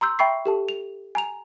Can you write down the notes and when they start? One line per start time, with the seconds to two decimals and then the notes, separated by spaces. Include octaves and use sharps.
0.01 A#5 C6 E6 G6
0.19 E5 G5 B5 C#6 C7
0.46 G4 A4 A5
0.69 F7
1.15 G#5 A#5 F7